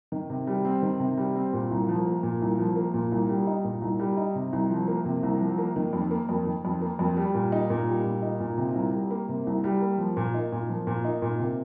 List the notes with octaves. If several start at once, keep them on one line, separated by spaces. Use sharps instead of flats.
D#3
C3
G3
C4
D#3
C3
G3
C4
A#2
C2
F3
A#3
A#2
C2
F3
A#3
A#2
C2
G3
D#4
A#2
C2
G3
D#4
C3
C2
F3
A#3
C3
C2
F3
A#3
D#3
F2
A#3
F2
D#3
F2
A#3
F2
G3
A#2
D#4
A#2
G3
A#2
D#4
A#2
C3
C2
G3
A#3
C3
C2
G3
A#3
F3
A#2
D#4
A#2
F3
A#2
D#4
A#2
C3